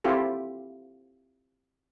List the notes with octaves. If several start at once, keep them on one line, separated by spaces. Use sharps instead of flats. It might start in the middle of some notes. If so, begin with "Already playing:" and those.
C4 E4 F4 G4 A4